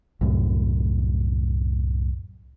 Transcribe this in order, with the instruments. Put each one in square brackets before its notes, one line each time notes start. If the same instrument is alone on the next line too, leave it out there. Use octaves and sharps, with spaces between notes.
[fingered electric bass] C2 F#2 A2